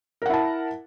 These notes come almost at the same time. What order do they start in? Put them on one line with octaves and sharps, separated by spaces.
A#4 F#5 E4 A5